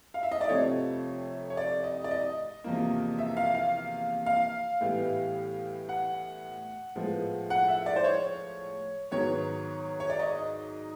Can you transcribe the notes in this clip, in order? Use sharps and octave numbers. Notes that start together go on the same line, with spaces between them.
F5
E5
D#5
D5
F2 C3 F3 A3 C#5
C#5
D5
D#5
D5
D#5
E2 C3 F3 A#3
E5
F5
F5
F5
A2 E3 G3 B3
F#5
A2 F3 G#3 B3
F#5
E5
D5
C5
C#5
G#2 D#3 F#3 B3 C#5
C#5
D5
D#5